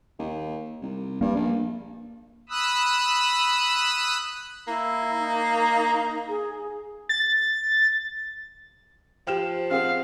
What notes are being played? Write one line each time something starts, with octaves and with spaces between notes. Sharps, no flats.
D#2
C2
G2 A#3
A#1
B5 D#6 E6 F#6
A#3 E4
D#4
G#4
A6
F3 G4 C5 G5 F6 E7
C4 G#4 F5 F#5